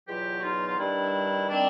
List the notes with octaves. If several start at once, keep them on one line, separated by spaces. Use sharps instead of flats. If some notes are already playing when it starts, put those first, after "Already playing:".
E2 B2 F#3 F4 G4
F#4
D#4 F4
F4
G2 D#3 G3 D4 E4
D#3 G3 C4 D4